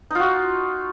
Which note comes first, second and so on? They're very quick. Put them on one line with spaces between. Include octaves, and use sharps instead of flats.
D#4 F4 F#4